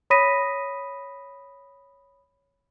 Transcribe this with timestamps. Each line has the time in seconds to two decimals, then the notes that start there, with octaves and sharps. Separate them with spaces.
0.10 C#5 B5 D#6 A#6 B6 D#7